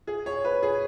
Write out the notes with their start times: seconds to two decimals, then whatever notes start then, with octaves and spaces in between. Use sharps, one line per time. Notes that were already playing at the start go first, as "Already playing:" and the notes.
0.07 G#4
0.26 C#5
0.45 B4
0.63 G#4